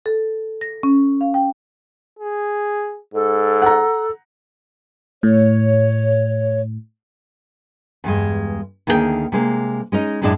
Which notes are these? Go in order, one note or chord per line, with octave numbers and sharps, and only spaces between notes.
A4
A#6
C#4
F5
G5
G#4
G#2 A4
F#5 A#5
A2 C#5
E2 G2 G#3
D2 D#3 A#3 G#4 A#4 G5
C3 G#3 A#3
G#3 C#4 D#4
F#2 A2 G#3 D4 E4 A5